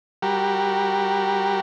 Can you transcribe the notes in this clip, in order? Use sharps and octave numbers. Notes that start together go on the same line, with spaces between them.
G3 F#4 G4 A#4